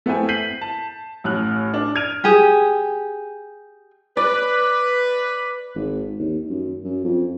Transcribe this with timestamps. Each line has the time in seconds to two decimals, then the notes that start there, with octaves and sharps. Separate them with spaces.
0.06 A3 B3 C4 E4 G5 G#5
0.29 G6 B6 C7 D#7 F#7
0.61 A5
1.24 A1 A2 F6 F#6
1.74 D4
1.95 F6 G#6 D7 D#7 F7
2.24 G4 G#4
4.17 B4 D5
5.75 G#1
6.19 D#2
6.50 F#2
6.84 F#2
7.04 F2